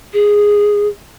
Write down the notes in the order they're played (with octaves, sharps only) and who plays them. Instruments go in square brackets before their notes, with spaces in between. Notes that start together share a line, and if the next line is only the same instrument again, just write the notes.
[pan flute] G#4